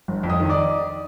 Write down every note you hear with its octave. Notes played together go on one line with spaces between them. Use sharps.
G1
F2
D#5 D#6
D#3
D5 D6